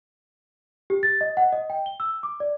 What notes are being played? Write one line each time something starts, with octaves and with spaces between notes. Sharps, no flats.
G4
A6
D#5
F#5
D#5
G5
G7
E6
D6
D5